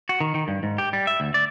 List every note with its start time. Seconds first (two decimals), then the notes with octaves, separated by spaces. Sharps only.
0.09 F#4
0.21 D#3
0.34 D#3
0.48 G2
0.63 G#2
0.78 G4
0.93 G3
1.07 E5
1.20 D2
1.34 D5